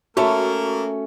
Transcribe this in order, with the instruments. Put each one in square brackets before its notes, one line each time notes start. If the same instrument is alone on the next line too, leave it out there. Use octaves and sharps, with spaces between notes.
[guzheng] A3 C#4 [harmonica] A#3 A#4 [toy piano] F#4 [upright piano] E5 A5 C#6